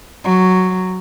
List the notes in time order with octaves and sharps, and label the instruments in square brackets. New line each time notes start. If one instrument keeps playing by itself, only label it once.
[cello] F#3